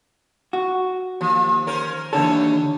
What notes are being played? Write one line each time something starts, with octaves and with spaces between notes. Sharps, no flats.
F#4
D#2 F3
C#4 A#4 C5
D#2 D3 E3 F#3 A4 C#5